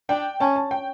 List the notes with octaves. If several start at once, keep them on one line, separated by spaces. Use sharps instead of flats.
D4 G5
C#4 A5
A5
G5